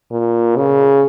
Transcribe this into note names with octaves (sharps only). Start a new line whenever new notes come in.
A#2
C#3